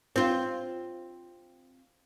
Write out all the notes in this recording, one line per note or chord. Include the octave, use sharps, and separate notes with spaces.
C4 F4